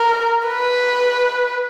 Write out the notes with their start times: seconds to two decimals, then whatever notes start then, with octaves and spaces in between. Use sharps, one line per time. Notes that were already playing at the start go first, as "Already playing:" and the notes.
Already playing: A#4
0.47 B4